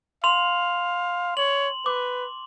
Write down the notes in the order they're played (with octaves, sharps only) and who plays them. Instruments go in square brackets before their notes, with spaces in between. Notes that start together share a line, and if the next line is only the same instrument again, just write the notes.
[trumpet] F5 [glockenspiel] C6 F7
[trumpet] C#5 [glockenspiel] F#7
[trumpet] B4 [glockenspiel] D6